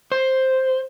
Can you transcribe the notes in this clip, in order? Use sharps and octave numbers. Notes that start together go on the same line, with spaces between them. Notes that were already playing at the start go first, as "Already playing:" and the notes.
C5